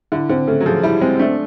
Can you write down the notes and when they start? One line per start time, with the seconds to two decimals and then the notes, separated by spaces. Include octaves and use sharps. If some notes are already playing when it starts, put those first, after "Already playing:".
0.12 D3 E4
0.29 D3 C4
0.48 C#3 A3
0.60 F#3
0.66 F3 G#4
0.83 G3 E4
1.01 G#3 C4
1.19 A3 D4